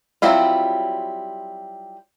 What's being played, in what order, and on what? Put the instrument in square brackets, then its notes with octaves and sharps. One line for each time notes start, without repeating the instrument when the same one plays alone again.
[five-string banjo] F#3 G3 C4 E4 F4